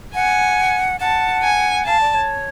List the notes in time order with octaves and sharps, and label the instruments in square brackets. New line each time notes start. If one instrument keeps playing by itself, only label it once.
[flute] F#5 [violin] G#5
[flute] F#5 [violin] A5
[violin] G#5
[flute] F5 [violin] A5
[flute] D5
C#5